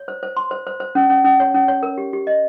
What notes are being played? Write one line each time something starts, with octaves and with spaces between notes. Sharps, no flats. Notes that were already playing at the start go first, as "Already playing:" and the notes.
Already playing: C#5
C5
C5
C6
C5
C5
C5
C#4
C#4
C#4
C#5
C#4
C#5
A#4
G4
G4
D#5